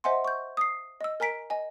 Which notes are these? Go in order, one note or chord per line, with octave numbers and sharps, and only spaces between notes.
C5 D#5 E5 F#5 G#5 C6
C#6 G6
D#6 C7
D#5 E6
A#4 G#5 A#5 B6 D7
D#5 G#5